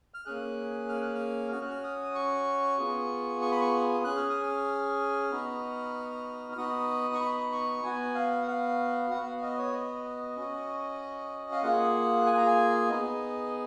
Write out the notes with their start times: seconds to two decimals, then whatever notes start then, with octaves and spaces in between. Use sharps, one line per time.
0.14 F6
0.25 A#3 C#4 G#4 F#6
0.89 F6
1.02 F#6
1.15 F6
1.52 C#4 F#4 F6
1.61 F#6
1.70 F6
1.84 D#6
2.15 C#6
2.79 B3 F4 G#4
3.42 C#6
3.52 B5
3.61 C#6
4.04 C#4 G#4 F#6
4.17 F6
4.30 D#6
4.42 F6
5.31 B3 D#4 F#4
6.53 F6
6.57 B3 D#4 F#4 D#6
7.14 C#6
7.20 B5
7.52 C#6
7.84 B3 F#4 G#5
8.15 F5
8.42 F#5
8.47 F5
9.11 B3 F#4 F#5
9.27 F5
9.42 D#5
9.58 C#5
9.73 D#5
10.36 C#4 F#4
11.52 F5
11.63 A#3 F4 G#4 F#5
12.26 G#5
12.37 A#5
12.46 G#5
12.89 B3 D#4 G#4 D#5